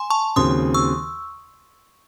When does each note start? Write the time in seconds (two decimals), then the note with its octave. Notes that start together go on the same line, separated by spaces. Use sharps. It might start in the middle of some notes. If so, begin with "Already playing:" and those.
Already playing: G#5 C6
0.10 A5 C#6
0.36 D#2 C#3 F#3 C4 C6 D#6
0.74 C#6 E6